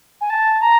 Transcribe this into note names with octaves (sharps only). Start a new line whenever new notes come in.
G#5
A5
A#5